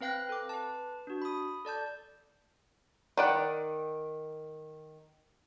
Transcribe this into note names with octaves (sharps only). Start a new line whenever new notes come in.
C4 B4 F5 G5 F#6 A#6
A4 D6
B4 A5
D4 F#4
B5 D#6
A4 D5 A5 G6
D#3 D5 F#5